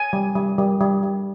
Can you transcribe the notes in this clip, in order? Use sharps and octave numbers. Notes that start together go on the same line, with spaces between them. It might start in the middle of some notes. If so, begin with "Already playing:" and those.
Already playing: G#5
G3
G3
G3
G3
G3